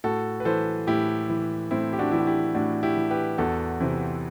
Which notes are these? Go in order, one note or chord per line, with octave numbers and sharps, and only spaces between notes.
A2 F#4 A4
B4
E3 A4 C5
A2 E4 G4
E3
A2 C4 E4
G4
D4 F#4
E3 E4
F#4
E4 G4
A2 D4 F#4
E4 G4
E3
G4 B4
E2 F#4 A4
C3 E3 C4 E4